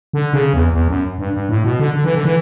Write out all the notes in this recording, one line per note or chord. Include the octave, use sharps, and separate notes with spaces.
D3
C#3
E2
E2
F#2
G2
G2
A2
B2
D3
D3
E3
D3
E3